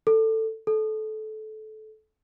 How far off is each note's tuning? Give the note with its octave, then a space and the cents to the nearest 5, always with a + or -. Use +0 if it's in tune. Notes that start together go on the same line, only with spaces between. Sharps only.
A4 +15
A4 -20